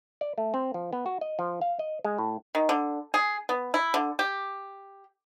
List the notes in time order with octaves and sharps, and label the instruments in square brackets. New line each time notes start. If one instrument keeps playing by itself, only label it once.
[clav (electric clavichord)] D5
A3
C4
F3
B3
F#4
D#5
F3
F5
D#5
G#3
A2
[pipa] D#3
D3
G#4
B3
E4
D3
G4